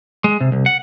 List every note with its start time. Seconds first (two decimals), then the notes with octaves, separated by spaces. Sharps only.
0.24 G#3
0.41 C3
0.52 C2
0.66 F#5